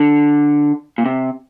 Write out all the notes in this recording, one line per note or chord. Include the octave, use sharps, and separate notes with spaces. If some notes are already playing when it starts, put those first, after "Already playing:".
Already playing: D3
A#2
C3